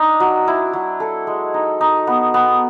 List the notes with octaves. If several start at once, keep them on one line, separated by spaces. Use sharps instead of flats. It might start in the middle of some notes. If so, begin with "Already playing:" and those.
Already playing: D4 D#4
F#3
E4
F#3
A4
G#3
D#4
D#4
B3
B3